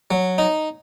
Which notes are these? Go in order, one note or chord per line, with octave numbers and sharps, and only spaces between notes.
F#3
D#4